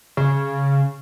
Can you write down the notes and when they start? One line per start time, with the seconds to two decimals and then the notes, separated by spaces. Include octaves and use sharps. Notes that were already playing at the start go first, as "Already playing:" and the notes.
0.17 C#3